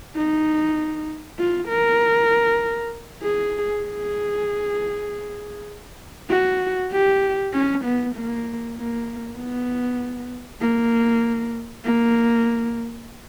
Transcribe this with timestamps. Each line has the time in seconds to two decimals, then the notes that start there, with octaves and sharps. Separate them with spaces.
0.16 D#4
1.39 F4
1.69 A#4
3.22 G#4
3.84 G#4
6.30 F#4
6.92 G4
7.53 C#4
7.84 B3
8.16 A#3
8.77 A#3
9.38 B3
10.61 A#3
11.85 A#3